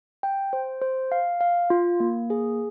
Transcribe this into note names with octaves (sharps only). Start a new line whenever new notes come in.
G5
C5
C5
F5
F5
F4
A#3
G#4